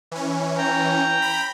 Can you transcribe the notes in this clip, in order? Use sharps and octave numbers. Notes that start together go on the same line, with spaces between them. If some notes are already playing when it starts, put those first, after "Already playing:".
E3 C#4
G5 A#5
B5